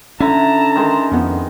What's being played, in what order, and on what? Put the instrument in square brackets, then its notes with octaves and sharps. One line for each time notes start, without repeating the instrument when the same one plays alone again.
[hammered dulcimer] D3 E4 [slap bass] C#4 [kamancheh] A5 A#5
[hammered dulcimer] D#3 G#3 C6
[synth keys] F2 B3